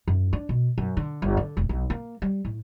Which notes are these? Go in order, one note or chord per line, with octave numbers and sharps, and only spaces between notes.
F#2
D4
B2
F#2
D3
G1
D3
E1
B1
A#3
G3
A2